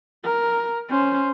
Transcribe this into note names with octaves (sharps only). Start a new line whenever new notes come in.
A#4
C#4 C5